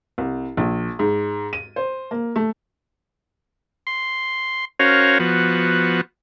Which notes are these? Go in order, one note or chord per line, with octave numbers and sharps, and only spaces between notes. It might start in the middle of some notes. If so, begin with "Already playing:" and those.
C2
A#1
G#2
D#7
C5
A#3
A3
C6
C#4 F#4 A#4 C5 C#5 F5
F3 B3 F#4